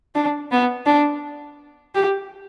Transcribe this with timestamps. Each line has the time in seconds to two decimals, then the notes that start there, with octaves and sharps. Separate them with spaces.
0.15 D4
0.51 B3
0.87 D4
1.95 G4